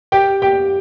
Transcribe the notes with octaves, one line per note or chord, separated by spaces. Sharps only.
G4 G5
G4 G5